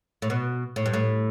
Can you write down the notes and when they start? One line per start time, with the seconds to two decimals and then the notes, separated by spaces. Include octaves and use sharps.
0.22 A2
0.30 B2
0.76 A2
0.86 G2
0.94 A2